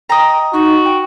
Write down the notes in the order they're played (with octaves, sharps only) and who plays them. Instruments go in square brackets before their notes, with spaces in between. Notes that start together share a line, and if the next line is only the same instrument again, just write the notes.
[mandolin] D#5 A#5 [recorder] G5
[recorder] D#4 [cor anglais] F#4
[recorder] G5